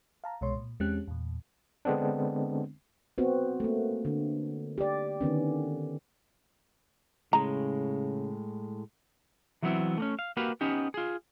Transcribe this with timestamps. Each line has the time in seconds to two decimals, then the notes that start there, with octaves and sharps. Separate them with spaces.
0.24 F5 A5 A#5
0.41 C2 B2 G#3 C#5 C6
0.56 A#2
0.80 E2 G#3 C4 C#4 G4 F#6
1.08 E2 A#2
1.85 D3 G#3 B3 C4 D4
3.18 B3 C4 F#4
3.60 A3 A#3
4.05 D3
4.78 G4 D5
5.21 D3 D#3 B3 C#4
7.33 A2 C#3 G#3 A#5
9.62 E3 F#3 A3 B3 C4 E4
9.98 A3 A#3 C#4
10.19 F5
10.37 A#3 F#4 G4 B4 F5
10.61 B3 C#4 D#4 G4
10.94 F4 G#4